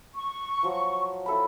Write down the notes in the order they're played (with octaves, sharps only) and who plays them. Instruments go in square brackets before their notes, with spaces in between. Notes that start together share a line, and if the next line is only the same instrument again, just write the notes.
[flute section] C#6
[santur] F3 F#3
E4 A4 B5